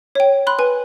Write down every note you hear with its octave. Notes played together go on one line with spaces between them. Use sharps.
C#5 G5
B5 C6 F#6
B4 G#5